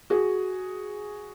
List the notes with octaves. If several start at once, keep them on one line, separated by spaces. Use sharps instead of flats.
F#4 G#4